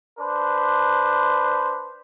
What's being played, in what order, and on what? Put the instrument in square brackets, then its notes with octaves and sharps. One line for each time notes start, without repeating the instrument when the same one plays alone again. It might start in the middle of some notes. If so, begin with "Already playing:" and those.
[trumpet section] D4 B4 C5